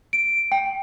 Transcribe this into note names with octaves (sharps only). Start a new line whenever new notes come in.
D7
G5